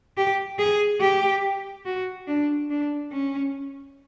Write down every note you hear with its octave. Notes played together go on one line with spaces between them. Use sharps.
G4
G#4
G4
F#4
D4
D4
C#4